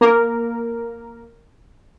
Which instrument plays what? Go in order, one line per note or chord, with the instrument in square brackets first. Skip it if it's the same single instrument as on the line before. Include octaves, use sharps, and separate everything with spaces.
[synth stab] A#3 A#4